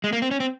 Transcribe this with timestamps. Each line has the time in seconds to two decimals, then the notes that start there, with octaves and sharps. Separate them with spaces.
0.04 G#3
0.13 A#3
0.22 C4
0.31 C#4
0.40 C4